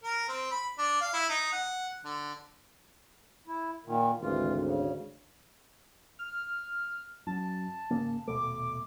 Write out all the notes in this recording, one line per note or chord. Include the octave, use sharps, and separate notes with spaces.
A#4
C4
B5
D4
F5
E4
D#4
F#5
D3
E4
A#2 D#3
G#1 D2 E3 F4
C#3
F6
F#2 A5
G#1 C#3 A#3
D#1 B2 A3 D6